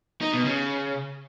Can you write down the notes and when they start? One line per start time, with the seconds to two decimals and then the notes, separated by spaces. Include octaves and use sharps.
0.21 D#4
0.33 B2
0.45 C#3